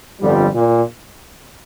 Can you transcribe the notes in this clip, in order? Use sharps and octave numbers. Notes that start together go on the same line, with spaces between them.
G1 F2 D3 G3
A#2